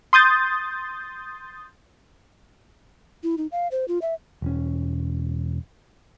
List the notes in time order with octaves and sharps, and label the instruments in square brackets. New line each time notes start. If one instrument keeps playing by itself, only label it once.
[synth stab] C6 D#6 G6 A6
[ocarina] E4
D#4
F5
C5
F4
E5
[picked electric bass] E1 C#4